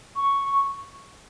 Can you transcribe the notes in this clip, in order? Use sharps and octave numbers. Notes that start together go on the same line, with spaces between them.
C#6